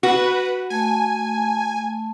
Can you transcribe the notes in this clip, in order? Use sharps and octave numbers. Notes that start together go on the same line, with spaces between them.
F#4 B4
A3 G#5 A5